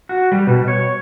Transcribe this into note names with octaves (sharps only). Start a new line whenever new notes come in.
F#4
G3
B2
C#5